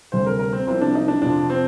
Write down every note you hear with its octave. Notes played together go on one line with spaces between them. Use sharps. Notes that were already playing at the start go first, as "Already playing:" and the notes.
D2 C3 G3 C5
A#4
A#4
C4
C2 C3 F3 C4
D4
D#4
D4
F2 C3 F3 D4
C4